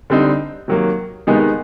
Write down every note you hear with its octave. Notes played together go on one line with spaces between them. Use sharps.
D3 G3 C4 D#4
C3 D#3 F#3 A#3
C3 D#3 G#3 B3 D#4